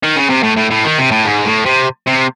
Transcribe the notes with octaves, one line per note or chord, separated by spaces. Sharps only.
D#3
C#3
C3
A2
A2
A2
D#3
C3
A2
G#2
A2
C3
C3